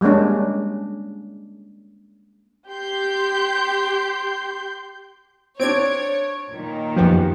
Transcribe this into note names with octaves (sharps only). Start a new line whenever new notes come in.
G3 G#3 A#3 C#4 D4
G4 C6 G6
C4 D4 C#5 G#6 D7
A#2 D#3
F#2 F3 B3 G4